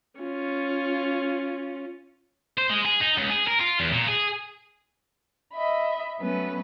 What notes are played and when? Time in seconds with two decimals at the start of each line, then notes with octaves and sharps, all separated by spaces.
0.20 C#4 F4
2.58 C5
2.70 G#3
2.86 G#4
3.01 D#4
3.18 C#2
3.30 G#4
3.47 A#4
3.60 F4
3.80 E2
3.93 A#2
4.08 G#4
5.53 D#5 E5 B5
6.20 F#3 A3 B3 C#4 B4